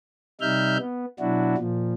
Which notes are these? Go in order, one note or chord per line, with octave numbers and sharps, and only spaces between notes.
C3 G3 D#4 E5 F6 G6
B3
B2 F#3 D4 E4 F#4
A#2 F3